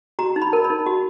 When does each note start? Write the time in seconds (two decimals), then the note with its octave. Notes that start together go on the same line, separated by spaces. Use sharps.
0.19 F#4 A#5
0.36 D#4
0.42 B5
0.53 A#4
0.64 B5
0.70 D#4
0.86 F#4